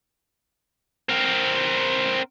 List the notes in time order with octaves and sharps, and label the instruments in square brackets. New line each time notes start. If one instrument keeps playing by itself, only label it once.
[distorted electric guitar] C4 A#4